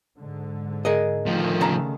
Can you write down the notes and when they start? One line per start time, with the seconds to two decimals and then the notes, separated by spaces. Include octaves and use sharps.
0.17 G#2 D3
0.85 G#4 A#4 D#5
1.26 A2 D3 D#3 F3 A3
1.61 C#3 A5 A#5